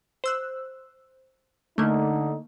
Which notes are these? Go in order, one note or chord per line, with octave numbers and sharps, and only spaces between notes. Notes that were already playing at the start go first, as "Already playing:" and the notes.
C5 E6 F#6
D3 A3 A#3 D#4